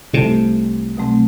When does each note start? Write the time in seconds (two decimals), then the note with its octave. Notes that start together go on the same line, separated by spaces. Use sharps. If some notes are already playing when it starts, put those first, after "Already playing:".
0.13 C2 C3 A3 E4 A4
0.97 B2 F#3 A3 C4